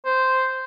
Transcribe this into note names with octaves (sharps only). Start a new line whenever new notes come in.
C5